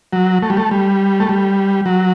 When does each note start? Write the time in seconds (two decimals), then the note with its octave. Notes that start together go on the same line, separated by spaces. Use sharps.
0.13 F#3
0.43 A3
0.50 G3
0.57 A3
0.71 G3
1.20 A3
1.29 G3
1.86 F#3